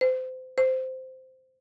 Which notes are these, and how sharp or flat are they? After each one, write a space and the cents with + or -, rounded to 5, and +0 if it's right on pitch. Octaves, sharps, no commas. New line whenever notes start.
C5 -25
C5 -10